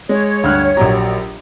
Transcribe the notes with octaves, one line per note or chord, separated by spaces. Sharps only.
G#3 C#5
D2 G2 F6 F#6
A#1 F#3 G4 A#5